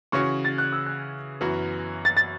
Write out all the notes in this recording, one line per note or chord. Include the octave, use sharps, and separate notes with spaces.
C#3 E3 C#4 F#4 C#6
A6
F#6
E6
F#6
F#2 E3 B3 F#4
A6
A6